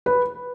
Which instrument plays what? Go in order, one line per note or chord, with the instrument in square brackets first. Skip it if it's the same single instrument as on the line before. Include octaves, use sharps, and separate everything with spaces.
[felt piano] B4